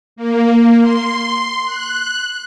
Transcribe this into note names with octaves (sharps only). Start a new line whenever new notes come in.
A#3
C6
F#6